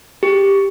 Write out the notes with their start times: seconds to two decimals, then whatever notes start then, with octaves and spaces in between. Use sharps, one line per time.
0.23 G4